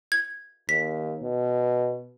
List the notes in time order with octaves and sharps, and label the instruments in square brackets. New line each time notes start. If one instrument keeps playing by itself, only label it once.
[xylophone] G#6
[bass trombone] D#2 [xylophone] B6
[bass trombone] B2